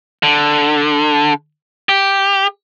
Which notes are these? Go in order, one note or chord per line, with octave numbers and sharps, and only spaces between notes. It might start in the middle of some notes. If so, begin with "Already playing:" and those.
D3
G4